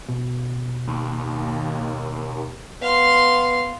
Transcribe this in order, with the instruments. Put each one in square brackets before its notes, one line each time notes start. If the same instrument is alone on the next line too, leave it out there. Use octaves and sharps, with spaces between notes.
[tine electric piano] B2
[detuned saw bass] D#2
[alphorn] B3 [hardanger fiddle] F5 C6